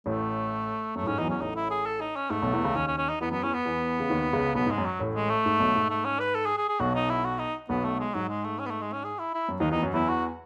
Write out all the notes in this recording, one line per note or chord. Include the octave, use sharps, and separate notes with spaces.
A1 A2 A3
F#2 A3
A2
G#2 C#4
E2 E3 D#4
F#3
E2 E3 C#4
A1 A2 D#4
E4
G#4
A4
D#4
C#4
G#2 A3
B1 B2
E2 E3
C#2 C#3
D#2 D#3 C#4
C#4
C#4
D#4
E2 E3 B3
F#2 F#3 B3
E2 E3 C#4
B3
E2 E3
C#3
D#2 D#3
C#2 C#3
B1 B2 B3
G#2
G#3
F#2
F#3
A1 A2
G#3
A3
G#2
B1 B2
G#2
A3
C#4
B4
A4
G#4
G#4
G#4
B1 B2 F#4
D#4
E4
F#4
D#4
B1 B2 B3
A3
G#3
G#2 F#3
G#3
A3
C#4
B3
A3
G#3
C#4
G#4
E4
E4
F#2
D#2 D#3 D#4
E2 E3 D#4
F#2 F#3
E2 E3 E4
F#4